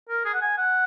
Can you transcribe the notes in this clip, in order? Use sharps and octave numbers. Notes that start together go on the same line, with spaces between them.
A#4
G#4
F#5
G#5
F#5